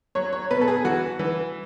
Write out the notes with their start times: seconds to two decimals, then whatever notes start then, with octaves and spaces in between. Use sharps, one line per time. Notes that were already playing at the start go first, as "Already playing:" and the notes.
0.15 F#3 C#5
0.33 C#5
0.51 B2 B4
0.61 A4
0.68 G#4
0.85 E3 F#4
1.19 E3